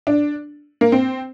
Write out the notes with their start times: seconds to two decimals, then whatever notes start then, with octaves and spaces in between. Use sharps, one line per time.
0.07 D4
0.81 A#3
0.92 C4